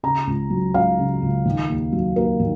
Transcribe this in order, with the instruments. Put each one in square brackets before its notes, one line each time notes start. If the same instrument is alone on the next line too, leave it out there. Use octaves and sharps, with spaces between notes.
[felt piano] C#3 A#5
C#2
F#3
C#2 F5
C#3
C#2
D#3
D#2
F#3
D#2 A#4
D#3